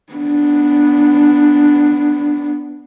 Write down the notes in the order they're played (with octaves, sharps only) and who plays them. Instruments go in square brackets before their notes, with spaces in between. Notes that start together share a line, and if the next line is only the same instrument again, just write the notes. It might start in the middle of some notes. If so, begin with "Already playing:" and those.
[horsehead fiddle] B3 D4